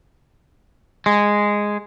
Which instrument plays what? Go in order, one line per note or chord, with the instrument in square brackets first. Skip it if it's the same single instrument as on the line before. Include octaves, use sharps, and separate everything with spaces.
[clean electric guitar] G#3